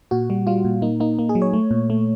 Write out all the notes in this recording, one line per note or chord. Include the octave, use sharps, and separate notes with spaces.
A#2 F#4
G3
G3 F4
A#2
A#3 D#4
A#3 D#4
A#3
G#4
F#3
C#5
A3
A#2
A3